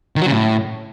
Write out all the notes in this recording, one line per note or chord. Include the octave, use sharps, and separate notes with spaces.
D#3
F#3
C#3
A2